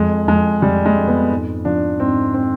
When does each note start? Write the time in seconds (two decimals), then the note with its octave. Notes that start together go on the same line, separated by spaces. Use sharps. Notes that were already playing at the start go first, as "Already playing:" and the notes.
Already playing: F2 G#3
0.27 F2 G#3
0.61 F2 G3
0.86 G#3
0.97 F2
1.08 B3
1.31 G#2
1.65 F3 D4
2.00 G#2 C4
2.34 C4